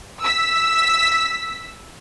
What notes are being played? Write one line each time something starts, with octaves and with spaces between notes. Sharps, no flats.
E6 B6